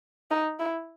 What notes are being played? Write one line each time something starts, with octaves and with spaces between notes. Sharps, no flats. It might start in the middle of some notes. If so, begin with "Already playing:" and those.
D#4
E4